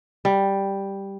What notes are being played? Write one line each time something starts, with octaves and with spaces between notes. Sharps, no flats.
G3